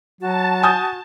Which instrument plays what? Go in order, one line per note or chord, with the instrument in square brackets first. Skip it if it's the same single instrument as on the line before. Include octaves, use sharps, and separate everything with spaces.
[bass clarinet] F#3 [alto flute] F#4 [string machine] A5
[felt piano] G#5 D#6 G6